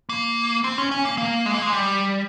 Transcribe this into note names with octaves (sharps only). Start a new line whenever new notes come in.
A#3
C4
C#4
C#4
A#3
A#3
G#3
A#3
G#3
G3